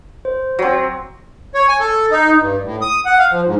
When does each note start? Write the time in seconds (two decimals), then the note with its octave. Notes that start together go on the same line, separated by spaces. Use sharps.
0.25 C5
0.59 F#3 C4
1.55 C#5
1.69 G#5
1.80 A4
2.11 D#4
2.39 G2
2.64 A2
2.81 D#6
3.05 F#5
3.19 F5
3.31 F3
3.46 G#2